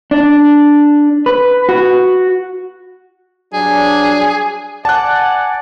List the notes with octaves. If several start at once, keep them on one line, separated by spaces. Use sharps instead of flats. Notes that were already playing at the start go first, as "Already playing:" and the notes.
D4
B4
F#4
G2 F#3 D4 G#4
D5 F#5 G#5 A5 F#6